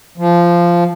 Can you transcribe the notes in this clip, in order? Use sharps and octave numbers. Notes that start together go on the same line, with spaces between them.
F3